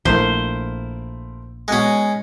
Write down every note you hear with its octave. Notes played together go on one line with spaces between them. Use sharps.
A#1 A3 E4 A#4 C5
B2 G#3 C#4 F#5